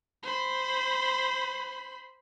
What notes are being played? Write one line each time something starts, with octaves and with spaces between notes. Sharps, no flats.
C5 B5